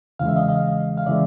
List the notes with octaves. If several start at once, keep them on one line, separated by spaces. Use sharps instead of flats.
E2 C#3 E3 G#3 F5
E5
D#5 F5
D#5 F5
F5
C#3 E3 G#3 D5 E5